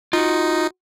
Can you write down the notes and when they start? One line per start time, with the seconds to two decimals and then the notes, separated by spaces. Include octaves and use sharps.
0.13 D#4 F4 F#4